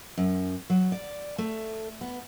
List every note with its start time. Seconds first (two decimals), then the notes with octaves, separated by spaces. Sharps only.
0.18 F#2
0.70 F#3
0.92 D5
1.38 A3
2.01 B3